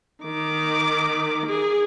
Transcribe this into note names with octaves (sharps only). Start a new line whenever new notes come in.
D#3 D6
G#4